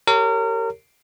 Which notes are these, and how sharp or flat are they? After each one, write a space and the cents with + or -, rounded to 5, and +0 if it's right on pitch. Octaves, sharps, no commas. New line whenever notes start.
G4 +0 A#4 -30 C#5 +0